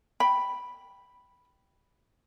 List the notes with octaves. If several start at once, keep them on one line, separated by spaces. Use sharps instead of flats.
G5 B5